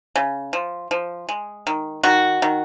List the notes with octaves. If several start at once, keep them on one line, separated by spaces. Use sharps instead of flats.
C#3
F3
F3
G#3
D#3
D#3 F#4
D#3